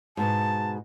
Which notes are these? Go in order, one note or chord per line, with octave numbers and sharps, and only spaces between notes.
G#2 B2 A5